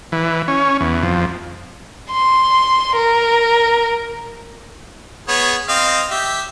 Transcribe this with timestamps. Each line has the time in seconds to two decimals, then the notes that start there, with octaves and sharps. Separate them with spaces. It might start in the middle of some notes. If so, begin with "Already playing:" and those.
0.12 E3
0.48 C#4
0.81 E2
1.03 F2
2.12 C6
2.96 A#4
5.28 B3 G#4 C#5
5.69 C4 D#5 F5
6.11 G4 E5